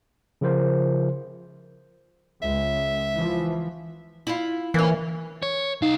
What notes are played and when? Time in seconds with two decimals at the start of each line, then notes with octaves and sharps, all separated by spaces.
0.41 C#3 F3 F4 A#4 C5
2.42 C#2 E5
3.13 E3 F3
4.27 E4 F4
4.74 E3 A#3 C#4
5.43 C#5
5.82 C2 D#4 F5